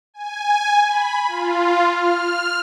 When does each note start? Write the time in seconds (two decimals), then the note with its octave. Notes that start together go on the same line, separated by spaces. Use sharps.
0.14 G#5
0.86 B5
1.27 F4
1.90 F6